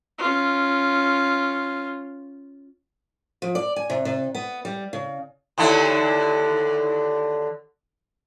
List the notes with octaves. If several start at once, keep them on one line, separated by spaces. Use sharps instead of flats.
C#4 F4
F3
D5
G#5
C3
C3
B3
G3
C#3
D#2 D3 E4